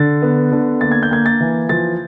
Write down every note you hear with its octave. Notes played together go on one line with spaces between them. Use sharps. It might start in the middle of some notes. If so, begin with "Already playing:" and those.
Already playing: D3 A6
B3
D3
A#3 A6
G#6
G6
A#3 G#6
A6
E3
F3 A6